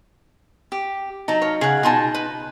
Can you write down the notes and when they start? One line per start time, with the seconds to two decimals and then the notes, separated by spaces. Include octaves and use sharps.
0.72 G4
1.28 F#3 D#4 A5
1.42 C#5 F5
1.61 C#3 G#4 F#5
1.83 B2 D#4 F4 G#5 A5
2.14 B4